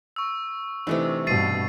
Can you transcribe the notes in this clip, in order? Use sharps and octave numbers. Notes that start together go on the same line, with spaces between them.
C#6 E6
C3 E3 A3 D4 D#4
G2 B2 A6 C7 D#7